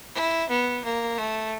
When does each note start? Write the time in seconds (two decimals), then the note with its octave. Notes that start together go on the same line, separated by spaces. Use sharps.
0.15 E4
0.49 B3
0.84 A#3
1.18 A3